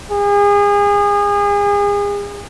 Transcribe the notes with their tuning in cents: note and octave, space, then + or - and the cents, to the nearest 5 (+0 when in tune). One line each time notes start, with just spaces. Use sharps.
G#4 -35